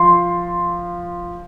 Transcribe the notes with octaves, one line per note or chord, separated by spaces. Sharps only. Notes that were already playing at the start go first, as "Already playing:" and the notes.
Already playing: F3 C6